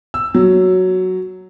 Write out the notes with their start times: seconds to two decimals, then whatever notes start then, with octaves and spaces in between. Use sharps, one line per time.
0.14 E6
0.34 F#3